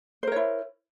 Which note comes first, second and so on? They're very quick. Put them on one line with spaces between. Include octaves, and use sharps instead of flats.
C5 A#4 C#5 E4